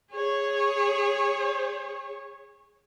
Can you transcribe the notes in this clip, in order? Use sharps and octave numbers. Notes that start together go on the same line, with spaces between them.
G#4 C#5